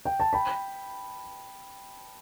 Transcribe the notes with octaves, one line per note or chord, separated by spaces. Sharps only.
G5
A5
G5 B5